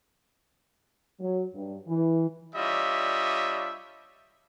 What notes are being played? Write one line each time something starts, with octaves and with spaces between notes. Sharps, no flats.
F#3
G2
E3
G3 D4 F4 C#5 D#5 E5